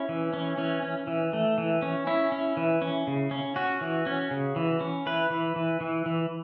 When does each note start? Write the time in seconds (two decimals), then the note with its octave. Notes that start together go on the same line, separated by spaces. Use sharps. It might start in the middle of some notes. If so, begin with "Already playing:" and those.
Already playing: C#4 E4
0.09 E3
0.33 C#4
0.58 E3 C#4
0.83 C#4
1.07 E3
1.33 A3
1.58 E3
1.82 C#4
2.07 C#4 E4
2.32 C#4
2.57 E3
2.82 C#4
3.07 C#3
3.31 C#4
3.56 C#4 F#4
3.81 E3
4.06 C#4
4.31 C#3
4.56 E3
4.81 C#4
5.06 E3 B4
5.30 E3
5.56 E3
5.81 E3
6.06 E3